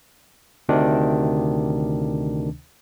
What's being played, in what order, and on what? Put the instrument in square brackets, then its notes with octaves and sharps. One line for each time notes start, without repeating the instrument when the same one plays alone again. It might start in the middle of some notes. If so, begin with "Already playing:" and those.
[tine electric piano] D2 C3 D#3 D4